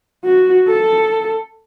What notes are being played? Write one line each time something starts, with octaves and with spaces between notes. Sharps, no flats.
F#4
A4